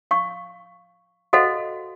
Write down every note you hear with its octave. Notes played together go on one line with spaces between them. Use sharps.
F5 C#6
F#4 A4 C5 D#5 F5 F#5